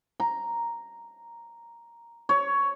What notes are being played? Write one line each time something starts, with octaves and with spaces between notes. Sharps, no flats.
A#5
C#5